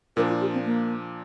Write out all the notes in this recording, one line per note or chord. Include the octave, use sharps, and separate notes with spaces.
A#2 F3 D4 A#4
F4
G4
C4
A#3